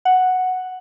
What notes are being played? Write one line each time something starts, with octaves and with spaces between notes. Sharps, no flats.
F#5